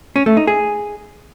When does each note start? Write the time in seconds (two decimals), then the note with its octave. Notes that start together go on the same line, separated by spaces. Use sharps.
0.16 C#4
0.26 A3
0.37 D#4
0.47 G#4